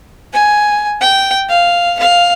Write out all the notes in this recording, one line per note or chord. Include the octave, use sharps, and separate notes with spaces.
G#5
G5
F5
F5